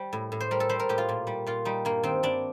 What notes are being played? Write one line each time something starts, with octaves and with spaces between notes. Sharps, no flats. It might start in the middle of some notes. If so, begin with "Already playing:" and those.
Already playing: G3 C5
A2
A2
C5
G3 A#4
A4
G3 C5
A#4
A2 G4
F4
A#2
G3
A#2 F4
G3 D#4
G2 A#3
D#3 C4
G2 D4